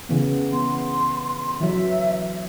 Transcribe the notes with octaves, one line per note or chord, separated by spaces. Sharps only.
C#3 E3 B3
B3 C6
E3 F#3 E5